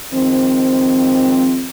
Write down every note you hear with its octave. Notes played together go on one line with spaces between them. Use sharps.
D#3 F3 G#3 C4